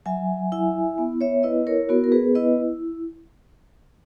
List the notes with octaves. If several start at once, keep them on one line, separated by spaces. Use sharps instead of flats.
F#3 E5 G#5
E4 E5 G#5
B3
C#5 E5
E4 B4 D#5
A#4 C#5
B3 F#4 A#4
A#4
G#4 B4
E4 B4 D#5